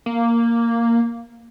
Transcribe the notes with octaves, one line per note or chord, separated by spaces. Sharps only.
A#3